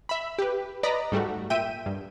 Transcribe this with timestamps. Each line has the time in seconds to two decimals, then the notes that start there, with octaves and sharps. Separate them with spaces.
0.09 E5 B5
0.39 G4 B4
0.83 B4 D5 D#5 A#5 B5
1.12 G#2 G3 A3 F#4
1.50 A#2 E5 G5 D#7
1.86 G2